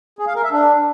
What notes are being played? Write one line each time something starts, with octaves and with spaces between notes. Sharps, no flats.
G#4
F5
A#4
E5
D4